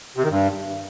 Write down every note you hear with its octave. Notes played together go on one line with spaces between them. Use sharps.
C3
D#3
G2